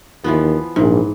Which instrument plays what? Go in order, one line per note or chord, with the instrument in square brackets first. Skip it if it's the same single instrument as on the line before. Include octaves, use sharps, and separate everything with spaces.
[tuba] D#2 [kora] E3 F3 B3
[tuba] A#1 [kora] G#2 E3